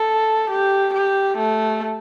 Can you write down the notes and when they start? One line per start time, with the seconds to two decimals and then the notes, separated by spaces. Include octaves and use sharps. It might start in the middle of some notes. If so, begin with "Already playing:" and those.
Already playing: A4
0.50 G4
0.94 G4
1.38 A3